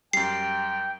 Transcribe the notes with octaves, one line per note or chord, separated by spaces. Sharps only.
F#2 G3 G5 C7